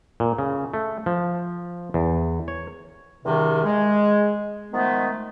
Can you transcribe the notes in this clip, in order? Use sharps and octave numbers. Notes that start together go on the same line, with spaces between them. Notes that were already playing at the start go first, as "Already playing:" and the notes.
A#2
C#3
A3
F3
E2
C#5
E2 G2 C3 D#3
G#3
D#3 F3 G#3 A3 B3